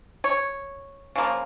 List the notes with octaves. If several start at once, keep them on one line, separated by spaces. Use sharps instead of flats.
C#5
C#3 F3 A#3